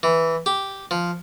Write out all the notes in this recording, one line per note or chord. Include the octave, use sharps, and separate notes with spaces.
E3
G4
F3